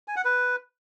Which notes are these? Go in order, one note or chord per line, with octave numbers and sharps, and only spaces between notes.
G#5
F#5
B4